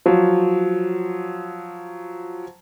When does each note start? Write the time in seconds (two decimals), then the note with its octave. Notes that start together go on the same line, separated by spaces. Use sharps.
0.06 F3 F#3